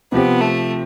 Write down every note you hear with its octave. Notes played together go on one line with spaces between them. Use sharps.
C3 F3 B3 C4 G4
A3